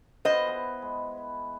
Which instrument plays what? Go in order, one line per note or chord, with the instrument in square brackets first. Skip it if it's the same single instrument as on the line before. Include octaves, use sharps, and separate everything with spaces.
[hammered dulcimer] B3 F4 B4 [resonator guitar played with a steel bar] C5 D#5
[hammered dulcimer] B3 E4 G#4
G#3